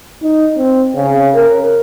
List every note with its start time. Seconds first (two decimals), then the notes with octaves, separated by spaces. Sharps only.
0.23 D#4
0.57 C4
0.95 C#3
1.35 A#4